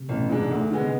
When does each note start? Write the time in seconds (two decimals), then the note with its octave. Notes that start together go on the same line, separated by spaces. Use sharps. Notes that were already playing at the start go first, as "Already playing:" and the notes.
Already playing: C3
0.08 A1 B2
0.29 G#2 G#3 D4
0.39 E3
0.51 D2 D3
0.71 D3 G#3 B3
0.81 C3